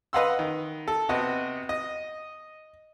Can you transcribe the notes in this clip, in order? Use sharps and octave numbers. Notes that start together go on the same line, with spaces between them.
B4 D#5 F5 F#5 C6 E6
D#3
A4
C3 B3 F#4 D#5
D#5